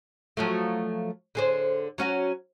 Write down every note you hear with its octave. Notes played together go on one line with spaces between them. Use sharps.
F3 F#3 A3
D3 G#4 C5
F#3 C#4 F#4